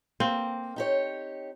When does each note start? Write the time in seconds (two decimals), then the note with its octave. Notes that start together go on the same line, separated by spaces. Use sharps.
0.20 A#3 C4
0.76 D#4 G4 C#5